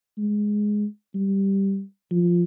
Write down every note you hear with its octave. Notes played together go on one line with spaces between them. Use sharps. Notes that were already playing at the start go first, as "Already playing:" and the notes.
G#3
G3
F3